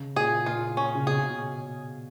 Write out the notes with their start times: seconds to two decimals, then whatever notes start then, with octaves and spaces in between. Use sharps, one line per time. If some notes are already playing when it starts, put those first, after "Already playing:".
Already playing: C#3
0.16 A#2 G#4
0.46 A#2 F4
0.77 C#4
0.95 C#3
1.07 B2 G#4